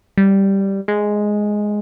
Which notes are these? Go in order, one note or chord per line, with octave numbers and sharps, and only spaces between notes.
G3
G#3